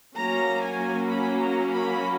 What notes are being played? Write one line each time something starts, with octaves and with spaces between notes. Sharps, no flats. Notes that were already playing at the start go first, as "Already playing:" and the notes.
F#3 A#3 C#4 A#5
G#5
B5
A#5
B5